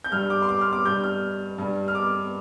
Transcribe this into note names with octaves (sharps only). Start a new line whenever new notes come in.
G6
G2 G3 F6
D6
C6
D6
F6
D6
G2 G3 G6
F6
G2 G3
F6
D6